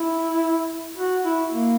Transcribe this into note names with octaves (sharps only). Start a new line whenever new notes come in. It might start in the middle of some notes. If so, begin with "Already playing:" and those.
Already playing: E4
F#4
E4
A#3